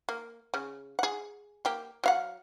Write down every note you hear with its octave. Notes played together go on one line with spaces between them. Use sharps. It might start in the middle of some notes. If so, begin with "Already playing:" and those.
A#3
C#3
G#4 F#5
A#3 G4
F#3 F5 F#5